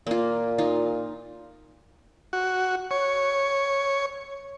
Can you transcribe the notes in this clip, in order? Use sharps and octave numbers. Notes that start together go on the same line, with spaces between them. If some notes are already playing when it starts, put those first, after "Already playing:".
A#2 A#3 F4
D#4 F4
F#4
C#5